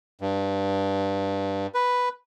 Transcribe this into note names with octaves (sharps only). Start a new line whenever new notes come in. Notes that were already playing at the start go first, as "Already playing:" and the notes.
G2
B4